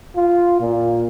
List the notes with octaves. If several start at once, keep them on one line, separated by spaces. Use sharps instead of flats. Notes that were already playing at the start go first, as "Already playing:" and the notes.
F4
A#2